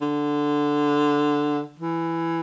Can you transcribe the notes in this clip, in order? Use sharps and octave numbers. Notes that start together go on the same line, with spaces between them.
D3
E3